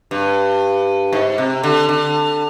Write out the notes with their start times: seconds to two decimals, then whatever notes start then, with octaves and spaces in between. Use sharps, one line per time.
0.11 G2
1.13 G#2
1.38 C3
1.63 D3
1.89 D3